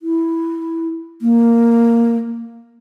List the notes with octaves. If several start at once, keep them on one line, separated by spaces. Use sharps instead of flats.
E4
A#3